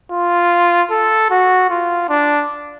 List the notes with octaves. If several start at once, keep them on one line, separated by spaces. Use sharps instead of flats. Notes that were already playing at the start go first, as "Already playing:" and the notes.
F4
A4
F#4
F4
D4